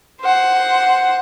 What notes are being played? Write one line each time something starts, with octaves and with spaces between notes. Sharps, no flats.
C5 F#5